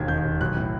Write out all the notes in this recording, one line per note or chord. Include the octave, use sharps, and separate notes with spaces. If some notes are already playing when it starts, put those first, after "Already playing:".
Already playing: E1 D#2 G#6
D#3 G6
E1
B1 F#6
A2